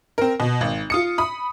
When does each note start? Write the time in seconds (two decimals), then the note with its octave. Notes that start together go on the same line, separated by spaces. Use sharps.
0.18 C4 A#4
0.40 B2
0.61 G#1
0.90 F4 D#6 C#7
1.18 B5 D#6